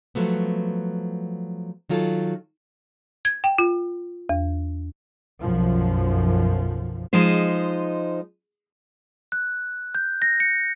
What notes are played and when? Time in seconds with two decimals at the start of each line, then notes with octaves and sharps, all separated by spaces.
0.15 F3 F#3 A3 B3
1.89 D#3 F#3 F4 A4
3.25 G#6
3.44 G5
3.58 F4
4.29 E2
5.41 B1 F#2 F3
7.13 F3 G#3 D#4 C5
9.32 F#6
9.95 G6
10.22 A#6
10.40 C#7